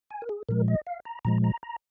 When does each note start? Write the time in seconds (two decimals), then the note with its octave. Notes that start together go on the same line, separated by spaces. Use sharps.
0.11 G#5
0.22 A#4
0.29 G#4
0.49 A#2 F3 G#3 A#4
0.68 D#5
0.87 F5
1.05 A#5
1.25 A#2 F3 G#3 A#5
1.44 A#5
1.63 A#5